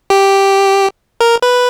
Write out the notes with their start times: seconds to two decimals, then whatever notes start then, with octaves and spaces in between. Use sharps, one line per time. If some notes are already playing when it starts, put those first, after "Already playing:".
0.10 G4
1.21 A#4
1.42 B4